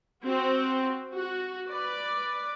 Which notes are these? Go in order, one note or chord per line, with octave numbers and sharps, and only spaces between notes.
C4 F#4
F#4
B4 D5